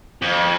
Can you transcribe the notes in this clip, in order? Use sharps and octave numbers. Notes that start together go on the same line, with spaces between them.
F2